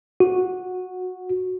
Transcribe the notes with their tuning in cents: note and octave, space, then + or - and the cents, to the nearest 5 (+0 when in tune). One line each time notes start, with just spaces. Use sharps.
F#4 -10